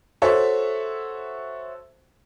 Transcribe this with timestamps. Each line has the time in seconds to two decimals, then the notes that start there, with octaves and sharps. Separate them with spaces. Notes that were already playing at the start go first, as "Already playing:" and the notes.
0.22 F#4 A4 C5 C#5 E5